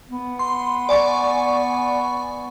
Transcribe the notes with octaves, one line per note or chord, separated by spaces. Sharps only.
B3
C6
D5 G#5 C#6